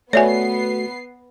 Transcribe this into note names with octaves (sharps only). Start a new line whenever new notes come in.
A3 B3 F#4 C#5 D5 E5 G#5 C7